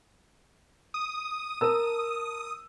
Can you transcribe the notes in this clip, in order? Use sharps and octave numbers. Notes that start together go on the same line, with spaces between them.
D#6
A#4 A5 E6